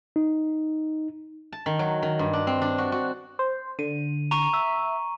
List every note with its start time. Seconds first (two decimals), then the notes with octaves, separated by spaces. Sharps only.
0.16 D#4
1.52 A5
1.66 D#3
1.79 F#3
2.02 D#3
2.19 G2
2.33 D4
2.47 C4
2.62 D4
2.78 F#4
2.92 F#4
3.39 C5
3.79 D3 D#7
4.31 A#5 C#6 D#7
4.53 E5